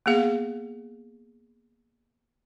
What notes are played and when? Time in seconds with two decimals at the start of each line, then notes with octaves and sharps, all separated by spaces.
0.06 A#3 B3 G#4 F5